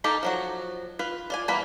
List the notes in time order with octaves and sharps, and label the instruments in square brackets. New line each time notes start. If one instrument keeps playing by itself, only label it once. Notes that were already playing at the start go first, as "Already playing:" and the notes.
[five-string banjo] A#3 D#4 G4 A4
F3 F#3 F#4
F4 B4
F4 D5 G#5
E3 G3 A#3 B3 B5